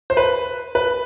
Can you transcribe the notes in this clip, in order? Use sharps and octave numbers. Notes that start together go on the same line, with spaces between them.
C5
B4
B4